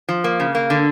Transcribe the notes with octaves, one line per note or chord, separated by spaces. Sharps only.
F3
A#3
C#3
A#3
D3